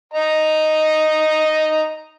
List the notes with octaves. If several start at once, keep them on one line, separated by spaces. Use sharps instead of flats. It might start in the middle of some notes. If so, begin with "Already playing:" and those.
D#5 A#5